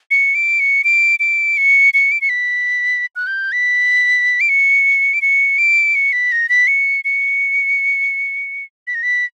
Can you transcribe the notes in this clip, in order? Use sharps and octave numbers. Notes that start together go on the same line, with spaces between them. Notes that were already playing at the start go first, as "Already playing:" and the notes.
C#7
D7
C#7
D7
D7
C#7
C#7
D7
C#7
B6
F#6
G6
B6
D7
C#7
D7
C#7
D7
C#7
B6
A#6
B6
C#7
C#7
B6
A#6
B6